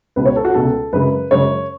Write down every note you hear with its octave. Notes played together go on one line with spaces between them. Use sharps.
C#2 B2 G#3 B4
C#5
A4
F#4
C#2 B2 G#3 A4
F#2 C#3 G#3 B4
F#2 C#3 G#3 C#5